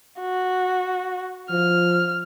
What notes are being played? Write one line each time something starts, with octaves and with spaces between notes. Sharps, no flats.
F#4
F3 F6